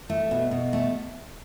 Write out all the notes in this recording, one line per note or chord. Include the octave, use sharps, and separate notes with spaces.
A3
B2
B2
A3